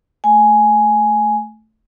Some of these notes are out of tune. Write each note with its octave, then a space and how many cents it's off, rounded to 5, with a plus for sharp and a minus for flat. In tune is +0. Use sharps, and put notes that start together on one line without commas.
A3 +0 G#5 +10